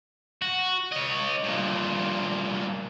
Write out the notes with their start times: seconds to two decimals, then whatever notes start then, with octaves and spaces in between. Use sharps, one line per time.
0.42 F#4
0.92 C#5 D#5
1.43 G2 A#2